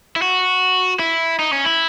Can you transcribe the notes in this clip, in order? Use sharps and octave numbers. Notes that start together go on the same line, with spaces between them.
E4
F#4
E4
D#4
C#4
E4